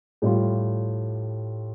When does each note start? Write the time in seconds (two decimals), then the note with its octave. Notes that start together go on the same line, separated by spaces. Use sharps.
0.22 A2 G3 F4